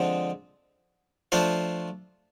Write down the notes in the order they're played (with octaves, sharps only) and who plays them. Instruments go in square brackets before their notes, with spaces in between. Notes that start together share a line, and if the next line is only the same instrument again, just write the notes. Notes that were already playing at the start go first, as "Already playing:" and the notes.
Already playing: [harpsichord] D3 F3 G#3 C4
F3 A3 D4 F4 C5